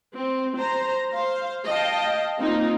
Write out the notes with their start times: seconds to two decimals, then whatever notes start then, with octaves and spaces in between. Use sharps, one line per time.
0.15 C4
0.57 C5 A#5
1.12 C5 F5
1.66 D#5 F5 G5 A5
2.39 A#3 C4 D#4 F4